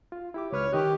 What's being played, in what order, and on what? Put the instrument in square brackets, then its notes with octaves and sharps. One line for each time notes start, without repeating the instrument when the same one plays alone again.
[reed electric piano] F4
E4 G4 D6
[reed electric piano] C#2 B4 F6 [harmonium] C#5
[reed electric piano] D#3 D#5 F#6 [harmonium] G4